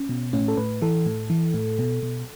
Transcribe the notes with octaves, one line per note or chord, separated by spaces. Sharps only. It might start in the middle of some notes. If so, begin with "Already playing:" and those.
Already playing: C#4
B2
A2 C#4
A4
A2 B4
E3 A4
A2
E3
A2
B2
B2